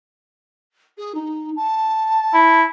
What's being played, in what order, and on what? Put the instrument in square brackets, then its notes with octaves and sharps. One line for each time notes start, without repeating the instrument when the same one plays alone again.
[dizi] G#4
D#4
A5
[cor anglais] E4